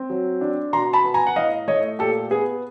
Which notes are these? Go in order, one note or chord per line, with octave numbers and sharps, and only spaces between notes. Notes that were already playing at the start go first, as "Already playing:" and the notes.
Already playing: C4
F#3
D4
B2 A#5 C6
A5 B5
B3
G#5 A#5
F#5
A2 D#5 F5
A3 C#5 D#5
A#2 G4 A4
B3 G#4